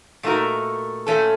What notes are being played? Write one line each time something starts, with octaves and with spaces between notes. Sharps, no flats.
A#2 A3 D#4 F#4 A#4
A#2 A3 C#4 A4